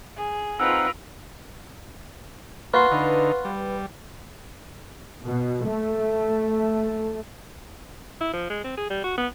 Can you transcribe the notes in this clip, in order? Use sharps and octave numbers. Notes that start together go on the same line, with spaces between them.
G#4
C4 D#4 F4 A#4 B4 F#5 E6
A#3 F4 F#4 B4 C6
D3 D#4
G3
B2
A3
E4
F3
G#3
C4
G#4
G3
F#4
B3